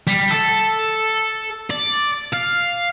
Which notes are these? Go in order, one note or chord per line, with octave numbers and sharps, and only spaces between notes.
G3
A4
D5
F5